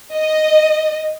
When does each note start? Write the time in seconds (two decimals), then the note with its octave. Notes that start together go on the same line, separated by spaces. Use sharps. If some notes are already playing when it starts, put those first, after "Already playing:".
0.15 D#5